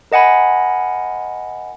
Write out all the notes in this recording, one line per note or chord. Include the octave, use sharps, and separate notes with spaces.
A#4 D#5 F#5 G#5 B5